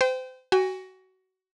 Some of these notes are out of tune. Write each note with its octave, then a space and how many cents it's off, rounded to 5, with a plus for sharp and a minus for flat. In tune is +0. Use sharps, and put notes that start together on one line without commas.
C5 -30 G5 +0
F#4 +20 G#5 -35